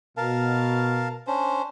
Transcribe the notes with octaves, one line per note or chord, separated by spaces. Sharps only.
B2 A#4 F5 A5
C#4 D4 C5